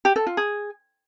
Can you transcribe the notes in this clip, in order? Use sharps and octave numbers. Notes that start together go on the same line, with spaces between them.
G4
A4
F4
G#4